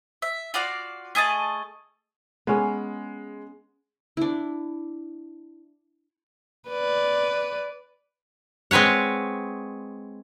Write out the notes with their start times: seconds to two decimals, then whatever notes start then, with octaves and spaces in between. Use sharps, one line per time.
0.22 E5
0.54 F4 F#4 D5 F5
1.15 A3 G#4 D#5 A5
2.47 G#3 B3 C#4 G#4
4.17 D4 E4
6.69 B4 D5
8.71 G#3 C4 B4 C#5 F#5